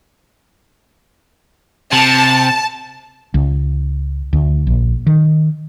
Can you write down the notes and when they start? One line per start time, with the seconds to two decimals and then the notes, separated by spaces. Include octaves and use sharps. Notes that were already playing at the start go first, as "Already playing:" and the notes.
1.92 C3 A5
3.34 C#2
4.33 D2
4.67 A#1
5.07 D#3